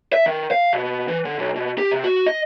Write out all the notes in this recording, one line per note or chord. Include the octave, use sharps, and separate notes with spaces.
E5
D#3
F5
B2
E3
D3
B1
B2
G4
C3
F#4
D#5